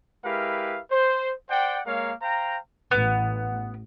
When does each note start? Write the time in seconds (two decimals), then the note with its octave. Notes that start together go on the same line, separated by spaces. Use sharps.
0.24 G#3 E4 G4 A#4 B4 F5
0.91 C5
1.49 C5 D5 F#5 G5
1.86 G#3 A#3 A#4 C#5 F5
2.22 C5 F5 G5 A#5
2.91 A1 B3